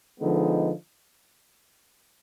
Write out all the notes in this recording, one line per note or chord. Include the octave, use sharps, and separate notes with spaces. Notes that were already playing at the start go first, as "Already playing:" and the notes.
D3 F3 G#3 B3 D#4